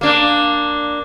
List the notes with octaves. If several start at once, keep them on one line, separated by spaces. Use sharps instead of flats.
A#3 D4